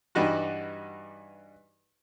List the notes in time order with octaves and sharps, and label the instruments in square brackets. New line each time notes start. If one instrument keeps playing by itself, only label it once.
[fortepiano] G2 E3 G3 D#4 F#4